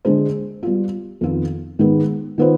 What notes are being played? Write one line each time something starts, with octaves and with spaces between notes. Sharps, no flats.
D3 G#3 D4 G#4 C5
G3 B3 F4
F2 D#3 B3 F4
G#2 D#3 G#3 B3
D#3 B3 F4 C5